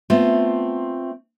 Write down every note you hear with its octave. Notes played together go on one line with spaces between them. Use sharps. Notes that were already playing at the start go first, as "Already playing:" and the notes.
A3 B3 C4 F4